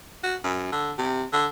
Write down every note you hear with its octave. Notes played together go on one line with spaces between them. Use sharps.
F#4
F#2
D3
C3
D3